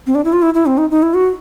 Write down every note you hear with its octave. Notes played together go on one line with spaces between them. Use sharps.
C4
D4
E4
F4
E4
E4
C4
D#4
D#4
E4
F#4